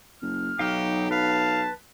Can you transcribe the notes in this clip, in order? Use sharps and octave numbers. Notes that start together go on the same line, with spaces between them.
F#1 F6
B1 F#3 D#4 G4 F5
B4 F5 A5